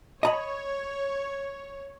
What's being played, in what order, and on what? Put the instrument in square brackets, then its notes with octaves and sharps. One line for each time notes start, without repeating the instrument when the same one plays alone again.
[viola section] C#5 [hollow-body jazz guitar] D#5 A#5 B5